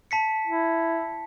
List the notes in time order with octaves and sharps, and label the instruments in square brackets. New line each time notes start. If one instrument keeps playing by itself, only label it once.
[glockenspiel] A5 B6 C#7
[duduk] E4